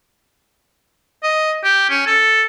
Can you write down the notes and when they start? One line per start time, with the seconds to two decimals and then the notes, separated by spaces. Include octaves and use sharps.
1.23 D#5
1.64 G4
1.90 C#4
2.07 A4